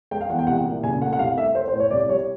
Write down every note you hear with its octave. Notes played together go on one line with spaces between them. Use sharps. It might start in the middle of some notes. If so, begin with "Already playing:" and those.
G#3 G5
F5
E2 F#5
G5
C2 F#5
A#2
C#3 G#5
A3 F#5
F#5
C2 F5
A3 E5
A3 C5
C5
A2
C#5
C2 D5
G3 C#5